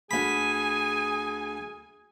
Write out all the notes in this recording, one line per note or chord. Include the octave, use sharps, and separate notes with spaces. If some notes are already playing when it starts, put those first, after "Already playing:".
D2 G#4 G#5 B5